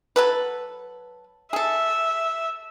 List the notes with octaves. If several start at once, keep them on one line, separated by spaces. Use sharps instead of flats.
F#3 A4 B4
G#4 A4 E5